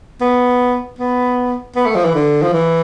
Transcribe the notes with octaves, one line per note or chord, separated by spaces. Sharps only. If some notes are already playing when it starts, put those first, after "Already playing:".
B3
B3
B3
A3
F3
E3
D3
F3
E3